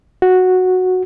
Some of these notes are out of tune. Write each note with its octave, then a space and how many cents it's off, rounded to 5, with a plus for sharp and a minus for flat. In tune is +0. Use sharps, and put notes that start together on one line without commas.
F#4 -5